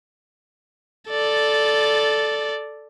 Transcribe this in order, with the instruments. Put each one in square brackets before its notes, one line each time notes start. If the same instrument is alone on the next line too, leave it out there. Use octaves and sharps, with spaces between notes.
[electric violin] A4 D5